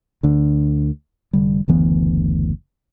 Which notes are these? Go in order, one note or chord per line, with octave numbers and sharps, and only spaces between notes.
D2 D3
F1 D3 G3
F#1 D2 E3 B3